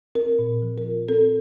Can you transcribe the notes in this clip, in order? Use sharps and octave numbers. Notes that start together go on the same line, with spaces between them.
C4 A#4
A#2
F3
A#4
F4
C4 A4